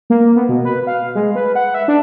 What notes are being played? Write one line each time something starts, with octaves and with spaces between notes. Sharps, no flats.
A#3
B3
B2
B4
F5
G#3
B4
F#5
E5
D4